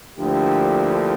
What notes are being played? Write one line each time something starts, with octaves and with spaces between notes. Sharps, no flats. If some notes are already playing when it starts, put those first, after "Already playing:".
D2 D3 F3 A#3 E4 G4